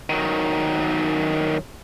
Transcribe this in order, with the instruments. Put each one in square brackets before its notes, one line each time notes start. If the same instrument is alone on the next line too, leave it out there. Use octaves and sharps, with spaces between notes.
[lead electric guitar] D#3 F#3